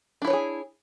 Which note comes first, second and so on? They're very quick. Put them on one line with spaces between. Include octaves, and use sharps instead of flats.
D4 E4 C#5 B4 G#4